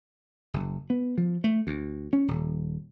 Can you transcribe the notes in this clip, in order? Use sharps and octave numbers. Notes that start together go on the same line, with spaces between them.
F#1
B3
F3
A3
D2
C#4
D#1